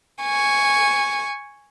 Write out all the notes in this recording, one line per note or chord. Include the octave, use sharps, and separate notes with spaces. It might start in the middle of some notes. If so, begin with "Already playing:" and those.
G#5 C#6